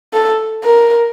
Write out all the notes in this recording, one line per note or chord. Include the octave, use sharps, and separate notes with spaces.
A4
A#4